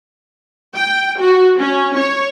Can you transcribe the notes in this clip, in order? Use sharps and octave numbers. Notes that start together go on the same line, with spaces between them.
G5
F#4
C#4
C#5